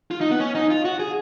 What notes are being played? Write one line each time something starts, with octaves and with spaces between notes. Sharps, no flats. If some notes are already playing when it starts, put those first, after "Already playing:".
F4
D#4
B3
C#4
D#4
F4
F#4
G#4